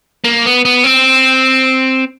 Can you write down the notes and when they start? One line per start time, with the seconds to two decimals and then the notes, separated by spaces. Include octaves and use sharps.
0.24 A#3
0.45 B3
0.65 B3
0.84 C4